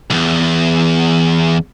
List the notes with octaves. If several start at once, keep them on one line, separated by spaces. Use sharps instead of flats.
B1 E2